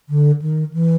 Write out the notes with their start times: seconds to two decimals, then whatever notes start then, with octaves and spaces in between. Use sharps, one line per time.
0.09 D3
0.42 D#3
0.74 E3